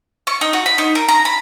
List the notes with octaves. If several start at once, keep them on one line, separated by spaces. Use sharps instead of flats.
C#6
D#4
F#4
B5
D#4
A#4
A#5
B5